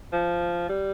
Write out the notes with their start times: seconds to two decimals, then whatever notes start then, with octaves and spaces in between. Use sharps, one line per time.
0.13 F3
0.69 G3